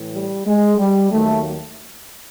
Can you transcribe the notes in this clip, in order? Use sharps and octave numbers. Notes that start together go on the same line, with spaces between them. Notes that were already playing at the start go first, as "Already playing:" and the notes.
Already playing: A2 E3
G3
G#3
G3
D#2 D#3 F#3 A3